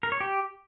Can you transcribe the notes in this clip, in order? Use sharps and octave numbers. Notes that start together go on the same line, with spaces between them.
A#4
C#5
G4